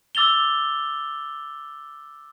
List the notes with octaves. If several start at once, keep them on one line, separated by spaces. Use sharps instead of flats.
D6 E6 A6 F7 G7